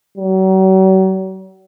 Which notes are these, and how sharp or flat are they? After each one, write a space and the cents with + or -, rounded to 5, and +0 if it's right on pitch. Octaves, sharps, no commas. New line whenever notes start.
F#3 +40